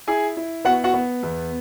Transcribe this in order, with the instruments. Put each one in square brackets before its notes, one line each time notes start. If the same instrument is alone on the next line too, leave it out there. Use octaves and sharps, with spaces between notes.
[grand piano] E4 G#4 G#5
E4
B3 F#4 F#5
F#4 F#5
B3
E2